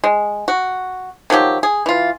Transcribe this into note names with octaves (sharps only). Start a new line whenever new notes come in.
G#3
F#4
D#3 F3 F#3 G4
G#4
E3 F4